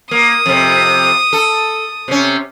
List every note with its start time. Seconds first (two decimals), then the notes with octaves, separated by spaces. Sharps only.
0.11 A#3 D#6
0.46 F2 C3
1.33 A4
2.08 C3 C#4